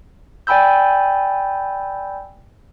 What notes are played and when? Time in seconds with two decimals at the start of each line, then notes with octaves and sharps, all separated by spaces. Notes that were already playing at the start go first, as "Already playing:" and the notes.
0.47 D5 G5 G#5 B5 E6 G6